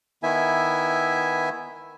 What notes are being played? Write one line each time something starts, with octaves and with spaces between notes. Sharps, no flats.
D#3 B3 E4 E5 G#5